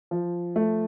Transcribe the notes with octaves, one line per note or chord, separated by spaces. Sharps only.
F3
A3